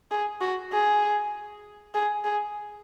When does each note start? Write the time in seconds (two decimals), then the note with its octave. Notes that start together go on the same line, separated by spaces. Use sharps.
0.11 G#4
0.41 F#4
0.72 G#4
1.94 G#4
2.24 G#4